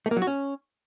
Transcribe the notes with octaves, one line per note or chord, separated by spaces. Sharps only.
A3
A#3
F#3
F#4
C#4